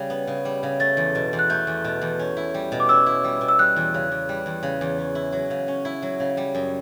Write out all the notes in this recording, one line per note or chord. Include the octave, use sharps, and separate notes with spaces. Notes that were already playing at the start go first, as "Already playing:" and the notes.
Already playing: C#3 G3
B3
C#3
G3
C#3
A3 A6
E2
B2
E2
F#6
A3 G6
E2
B2
E2
C#4
E4
G3
B2
D6
C#4 E6
E4
G3
B2
E6
G3 F#6
E2
C#3
E2
G3
E2
C#3
E2
C#4
E4
F#3
C#3
C#4
E4
F#3
C#3
G3
F#2